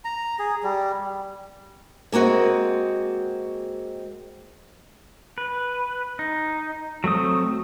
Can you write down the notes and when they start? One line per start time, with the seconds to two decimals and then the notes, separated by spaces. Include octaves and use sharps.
0.05 A#5
0.39 G#4
0.63 G3
2.12 G#3 A#3 C4 F#4 D#5
5.38 B4
6.19 D#4
7.04 F#3 A3 C4 D#6